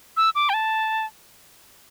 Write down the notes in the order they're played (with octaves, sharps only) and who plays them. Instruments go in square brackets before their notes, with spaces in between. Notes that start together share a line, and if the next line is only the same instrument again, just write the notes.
[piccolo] E6
D6
G5
A5